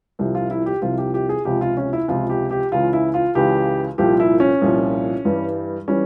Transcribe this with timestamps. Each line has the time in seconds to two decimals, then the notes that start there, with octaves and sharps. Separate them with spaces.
0.19 C2 C3 F3
0.35 F4
0.51 E4
0.66 G4
0.82 C2 C3 F3 F4
0.98 G4
1.14 G4
1.29 G#4
1.45 C#2 C3 F3 G4
1.61 F4
1.77 C#4
1.93 E4
2.08 C#2 C3 F3 F4
2.30 G4
2.51 G4
2.72 C#2 C#3 E3 F4
2.93 E4
3.14 F4
3.35 C#2 C#3 E3 G4
3.98 C2 A#2 F3 G4
4.20 E4
4.40 C#4
4.61 C2 A#2 F3
5.25 G2 E3 G3
5.88 E3 G3 C#4